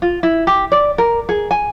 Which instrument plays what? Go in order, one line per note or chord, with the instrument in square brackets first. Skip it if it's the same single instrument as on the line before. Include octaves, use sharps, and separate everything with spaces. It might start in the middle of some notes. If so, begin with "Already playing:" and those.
[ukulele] F4
E4
G4
D5
A#4
G#4
G#5